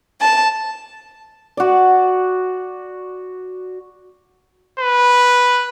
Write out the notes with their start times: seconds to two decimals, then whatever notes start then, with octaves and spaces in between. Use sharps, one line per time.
0.21 A5
1.57 F#4 D5
4.80 B4